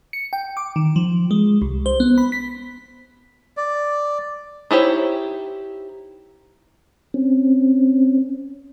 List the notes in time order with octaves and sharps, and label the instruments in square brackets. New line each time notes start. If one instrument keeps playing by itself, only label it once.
[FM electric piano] C#7
G5
D6
D#3
F3
G#3
C2
C5
B3
B5
B6
[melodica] D5
[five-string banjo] D#4 E4 G4 C5 C#5
[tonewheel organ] C4 C#4